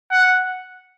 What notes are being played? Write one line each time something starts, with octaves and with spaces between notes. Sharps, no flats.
F#5